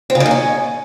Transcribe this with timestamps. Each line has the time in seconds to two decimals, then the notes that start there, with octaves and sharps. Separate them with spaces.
0.10 C4
0.15 C#3
0.20 D#3
0.26 A#3
0.31 C#4